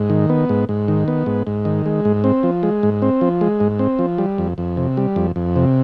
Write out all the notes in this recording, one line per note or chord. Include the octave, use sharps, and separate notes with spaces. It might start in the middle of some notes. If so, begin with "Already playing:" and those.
Already playing: G#2
D#3
B3
G#2
G#2
D#3
B3
G#2
G#2
D#3
G#3
G#2
C4
F3
G#3
G#2
C4
F3
G#3
G#2
C4
F3
G3
F2
F2
C3
G3
F2
F2
C3